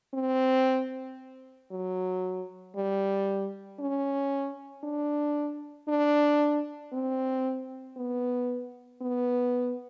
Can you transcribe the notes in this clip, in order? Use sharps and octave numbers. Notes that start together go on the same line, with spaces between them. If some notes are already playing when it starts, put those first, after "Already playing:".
C4
F#3
G3
C#4
D4
D4
C4
B3
B3